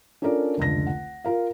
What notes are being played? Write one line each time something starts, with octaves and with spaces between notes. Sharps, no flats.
C#4 D4 F4 A4 A#4 D5
F1 C#2 D3 D4 A#6
F#5
F4 A#4 F5